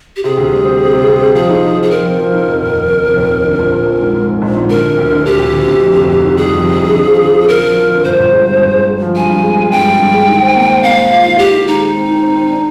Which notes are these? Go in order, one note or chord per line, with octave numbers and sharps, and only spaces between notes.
G4
C3 G#4
D2
G3
C4
C4
C3
C3
C4
F3 G#4
D#4
D#4
F3
G#4
F3 A#4
C4
F3
D#4
F1
D#2
F1
F1
F1
D#2
F1
D3
A#1
A#1
A#1
G#2
G#2
G#2
A#1
G#2
D3 A#4
D3
D2
D3
D2 G4
D2
D2
D2
F2
F1
F1
D#3
G3 G#4
F2
F1
D#3
D3
F3
D3
F3
F3 A#4
F3
F3
D3
G1 C5
G1
G#3
G2
G1
G#3
G#3
F3
G2 G#5
G2
G#3
G#3
G2 G5
G#3
G2
G#3
D#3
C5
A#3
C5
A#3 F5
C5
F4
D#3
D#3 G4
D#3
G#3 D#4
G#3
C4
D#3
C4
C4
D4